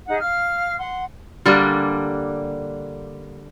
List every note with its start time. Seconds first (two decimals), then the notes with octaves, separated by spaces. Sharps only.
0.06 D#4 G#4 F#5
0.20 F5 F6
0.78 F#5 C6
1.46 D3 G3 A#3 D4